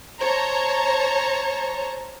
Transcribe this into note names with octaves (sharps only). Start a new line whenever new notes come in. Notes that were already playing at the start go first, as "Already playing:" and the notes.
C5 C#5 A5 A#5